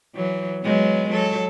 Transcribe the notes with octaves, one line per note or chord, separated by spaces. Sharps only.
E3 F#3
F#3 G#3 B3
F#3 A4